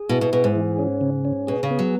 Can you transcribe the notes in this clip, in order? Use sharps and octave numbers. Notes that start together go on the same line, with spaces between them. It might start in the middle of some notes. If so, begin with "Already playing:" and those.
Already playing: G#4
B2 E4
B2
B2 G#4
G#2
E3
C#4
C#3
C#4
B2 G#4
C#3
B3
F#3